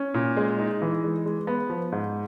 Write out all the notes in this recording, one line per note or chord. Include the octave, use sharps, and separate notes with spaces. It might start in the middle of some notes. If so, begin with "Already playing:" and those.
Already playing: C#4
A#2
G#3
D#4
E3
G#3
G#3
B3
F3
G#2